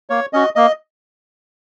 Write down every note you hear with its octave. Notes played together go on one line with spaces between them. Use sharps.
A#3 C#5
C#4 F#4 D#5
A#3 D#5